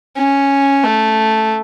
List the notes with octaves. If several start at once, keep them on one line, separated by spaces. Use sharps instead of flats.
C#4
A3